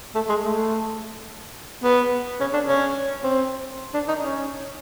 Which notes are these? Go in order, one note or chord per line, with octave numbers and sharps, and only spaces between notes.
A3
G#3
A3
B3
C#4
D4
C#4
C4
D4
D#4
C#4